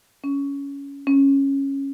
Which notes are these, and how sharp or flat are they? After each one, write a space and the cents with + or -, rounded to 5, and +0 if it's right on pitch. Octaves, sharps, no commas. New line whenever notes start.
C#4 +15
C#4 -10